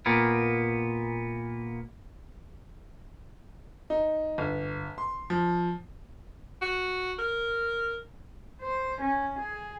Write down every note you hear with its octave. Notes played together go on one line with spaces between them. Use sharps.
A#2 A#3 B3
D#4
G1
C6
F3
F#4
A#4
C5
C#4
G#4